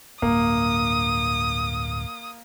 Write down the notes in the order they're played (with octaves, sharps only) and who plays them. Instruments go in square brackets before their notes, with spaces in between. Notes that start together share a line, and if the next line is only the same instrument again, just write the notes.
[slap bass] D1 G2 [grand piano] A#3 [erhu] D#6